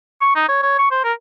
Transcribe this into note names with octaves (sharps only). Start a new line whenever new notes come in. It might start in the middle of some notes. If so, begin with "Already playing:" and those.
C#6
D#4
C#5
C#5
C#6
C5
A#4